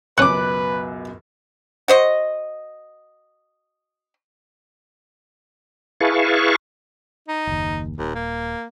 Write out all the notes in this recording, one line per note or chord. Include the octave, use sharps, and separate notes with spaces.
C#2 F#2 B2 C#4 B4 C#6 D6 F#6
F#4 C5 D#5
E4 G#4 B4 F5 A5 C#6
D#4
F#1 D#2
D#1 D#2
A#3